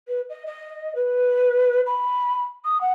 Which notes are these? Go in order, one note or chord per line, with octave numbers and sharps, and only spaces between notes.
B4
D#5
D#5
B4
B5
D#6
F#5